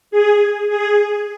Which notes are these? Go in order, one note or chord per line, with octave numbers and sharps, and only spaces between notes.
G#4
G#4